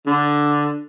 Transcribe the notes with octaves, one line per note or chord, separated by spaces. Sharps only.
D3